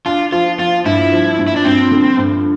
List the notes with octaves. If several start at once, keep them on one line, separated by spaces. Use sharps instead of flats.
D4 F4
F3 F4
F3 F4
G2 E4
F3
G2
E4
D4
G2 C4
D3
G2